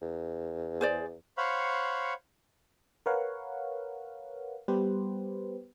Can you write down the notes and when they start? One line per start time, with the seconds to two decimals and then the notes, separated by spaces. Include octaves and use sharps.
0.02 E2
0.81 G#4 C5 D5
1.38 C5 C#5 F5 F#5 B5 C#6
3.06 A#4 B4 C#5 F5 F#5
4.68 G3 B3 G4 B4 C5